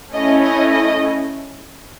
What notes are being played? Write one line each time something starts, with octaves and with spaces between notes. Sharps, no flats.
A3 C#4 E4 D#5
D#5
D#5